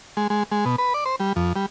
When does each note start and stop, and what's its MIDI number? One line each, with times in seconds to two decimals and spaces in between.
0.17 0.27 56
0.30 0.43 56
0.52 0.65 56
0.65 0.76 47
0.78 0.93 71
0.94 1.04 74
1.05 1.16 72
1.20 1.33 55
1.36 1.53 41
1.56 1.66 55